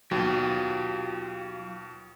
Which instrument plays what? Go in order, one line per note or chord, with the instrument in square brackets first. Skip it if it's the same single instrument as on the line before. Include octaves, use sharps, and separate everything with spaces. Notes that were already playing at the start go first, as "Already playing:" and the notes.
[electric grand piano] D#2 B2 [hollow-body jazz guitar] F#3 [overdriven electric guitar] F4 G4